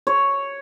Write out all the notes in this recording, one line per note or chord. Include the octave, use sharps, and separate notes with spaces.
C#5